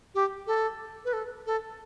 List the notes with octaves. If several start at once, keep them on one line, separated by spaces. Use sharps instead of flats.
G4
A4
B4
A4
A4